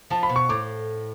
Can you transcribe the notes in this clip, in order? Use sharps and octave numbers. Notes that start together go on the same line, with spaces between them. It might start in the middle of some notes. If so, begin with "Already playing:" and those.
F3 A5
B5
B2
C#6
A2 D6